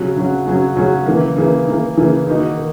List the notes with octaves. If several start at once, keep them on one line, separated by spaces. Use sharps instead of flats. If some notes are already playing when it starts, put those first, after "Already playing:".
Already playing: C#3 F#3 C#4 F#4
C#3 F#3 C#4 F#4
C#3 F#3 C#4 F#4
C#3 F#3 C#4 F#4
C#3 E3 A#3
C#3 E3 A#3
C#3 E3 A#3
C#3 E3 A#3
D#3 A#3 D#4 F#4
D#3